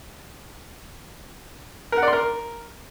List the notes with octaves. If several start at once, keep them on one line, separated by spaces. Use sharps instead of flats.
A#4
F#5
D5
C6
A#4